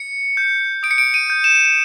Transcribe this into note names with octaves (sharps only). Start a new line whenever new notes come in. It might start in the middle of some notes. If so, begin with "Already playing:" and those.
Already playing: C#7
G6
D#6 D7
C#7
D7
D#7
G6
E7